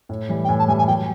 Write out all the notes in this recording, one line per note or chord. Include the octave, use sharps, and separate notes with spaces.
A2
E3 G3
G5
A2 G#5
A5
E3 G3 G#5
G#5
F#3 G5